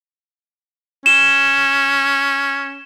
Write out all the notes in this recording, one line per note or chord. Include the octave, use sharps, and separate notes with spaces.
C#4 E7 G7